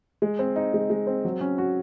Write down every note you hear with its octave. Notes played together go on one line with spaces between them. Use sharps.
G#3
C4
D#4
G#3
G#3
C4
F#3
C#4
F#4